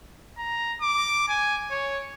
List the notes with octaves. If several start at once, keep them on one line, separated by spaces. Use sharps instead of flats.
A#5
D6
G#5
C#5